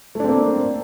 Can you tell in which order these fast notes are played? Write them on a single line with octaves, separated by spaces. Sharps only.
A3 D4 C4 A#3